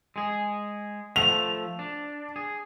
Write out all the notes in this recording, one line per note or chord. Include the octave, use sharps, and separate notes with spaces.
G#3 G#4
F3 A3 F7
D4
G#4